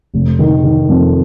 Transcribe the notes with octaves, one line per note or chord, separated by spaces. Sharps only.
F1
D#3
D#3
F2